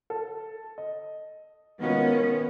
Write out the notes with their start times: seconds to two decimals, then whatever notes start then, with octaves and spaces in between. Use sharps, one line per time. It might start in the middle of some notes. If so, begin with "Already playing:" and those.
0.10 A4
0.78 D#5
1.81 D#3 G#3 B3 C#4 F4 F#4 A#4